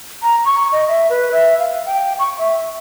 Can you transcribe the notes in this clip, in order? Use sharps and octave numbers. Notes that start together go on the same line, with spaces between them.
A#5
C#6
D#5
E5
B4
E5
F5
G5
C#6
E5